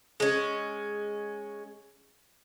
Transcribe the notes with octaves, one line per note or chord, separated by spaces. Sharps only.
G#3 C#4